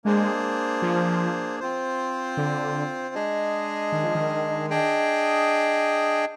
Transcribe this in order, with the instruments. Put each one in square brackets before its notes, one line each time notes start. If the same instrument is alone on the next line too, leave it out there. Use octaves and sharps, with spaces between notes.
[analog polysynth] G#3 [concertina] A#3 D4 G#4 C5
[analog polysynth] F3
[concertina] C4 F4 C5
[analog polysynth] D3
[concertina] G#3 D4 G#4 D#5
[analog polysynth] D#3
F3
D#3
[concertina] D4 G#4 D#5 G5